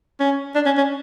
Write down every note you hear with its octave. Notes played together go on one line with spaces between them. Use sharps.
C#4
D4
C#4
C#4